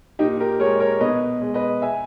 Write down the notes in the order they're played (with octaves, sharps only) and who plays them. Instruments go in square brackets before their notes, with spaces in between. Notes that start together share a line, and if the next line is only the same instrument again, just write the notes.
[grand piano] A#2 D#4 G4
G4 A#4
G#3 A#4 C#5
A#4 C#5
B2 B4 D#5
G#3
B4 D#5
E5 G#5